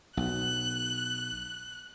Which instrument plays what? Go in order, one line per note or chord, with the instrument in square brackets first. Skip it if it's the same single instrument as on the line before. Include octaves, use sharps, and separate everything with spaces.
[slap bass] B1 [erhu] F#6